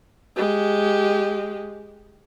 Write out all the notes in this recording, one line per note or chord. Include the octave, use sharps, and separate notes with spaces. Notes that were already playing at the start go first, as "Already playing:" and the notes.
G#3 G4